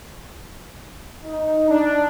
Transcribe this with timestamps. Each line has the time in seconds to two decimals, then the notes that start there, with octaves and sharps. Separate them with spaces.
1.24 D#4
1.69 D4